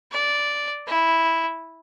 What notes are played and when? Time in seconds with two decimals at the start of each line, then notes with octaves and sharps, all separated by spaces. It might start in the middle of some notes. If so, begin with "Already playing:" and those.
0.12 D5
0.87 E4